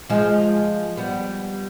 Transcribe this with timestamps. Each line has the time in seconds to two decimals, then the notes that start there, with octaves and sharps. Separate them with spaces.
0.10 F3 G#3
0.97 G3 B3